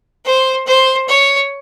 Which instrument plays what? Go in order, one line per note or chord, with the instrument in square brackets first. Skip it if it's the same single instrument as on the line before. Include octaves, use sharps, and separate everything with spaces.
[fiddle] C5
C5
C#5